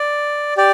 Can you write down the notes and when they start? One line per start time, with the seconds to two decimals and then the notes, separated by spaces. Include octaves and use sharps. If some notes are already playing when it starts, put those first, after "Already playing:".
Already playing: D5
0.57 G4 D5